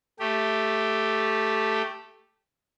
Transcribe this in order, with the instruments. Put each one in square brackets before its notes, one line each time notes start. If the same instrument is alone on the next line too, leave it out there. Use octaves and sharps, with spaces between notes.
[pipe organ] A3 G4